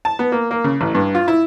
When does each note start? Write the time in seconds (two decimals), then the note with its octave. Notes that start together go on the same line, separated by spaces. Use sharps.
0.05 A5
0.19 B3
0.32 A#3
0.51 A#3
0.64 C#3
0.81 A1
0.95 G2
1.15 F4
1.28 E4